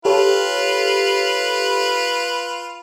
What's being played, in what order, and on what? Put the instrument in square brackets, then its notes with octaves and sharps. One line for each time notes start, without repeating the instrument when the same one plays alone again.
[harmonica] F4 B4 [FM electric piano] G4 A4 C#5